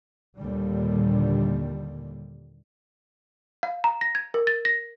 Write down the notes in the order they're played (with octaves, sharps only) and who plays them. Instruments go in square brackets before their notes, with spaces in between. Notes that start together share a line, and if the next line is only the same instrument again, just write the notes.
[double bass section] D#2 A#2 D3 D#3 G3
[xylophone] F5
A#5
A#6
G#6
A#4
A6
A#6